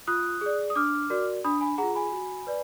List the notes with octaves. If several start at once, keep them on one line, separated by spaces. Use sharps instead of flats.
F4 D#6 F#6
G#4 D5
D#6
D4 D6 F6
F#4 A#4 D5
D4 B5 D#6
G#5 B5
F4 G#4 F#5 A#5
G#5 B5
F#4
B4 D5